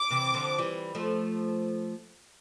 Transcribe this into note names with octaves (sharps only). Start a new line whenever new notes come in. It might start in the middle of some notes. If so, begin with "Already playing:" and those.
Already playing: D6
C3 E3
D3 F3
E3 G3
F3 A3